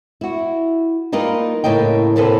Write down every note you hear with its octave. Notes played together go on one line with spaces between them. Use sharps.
E4 F#4
G3 A#3 D#4 F4 B4 F5
A2 C#3 A#3 D#5 G5
D2 A2 C3 A#3 A4 B4